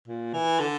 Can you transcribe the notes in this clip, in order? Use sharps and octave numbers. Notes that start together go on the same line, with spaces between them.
A#2
E3
D3